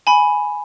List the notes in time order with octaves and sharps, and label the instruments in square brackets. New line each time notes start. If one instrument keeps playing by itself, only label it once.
[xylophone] G#5 B5